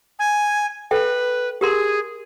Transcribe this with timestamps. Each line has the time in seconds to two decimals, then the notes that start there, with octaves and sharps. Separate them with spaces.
0.19 G#5
0.91 A4 B4 E5 G5
1.61 G4 G#4 A#4 C6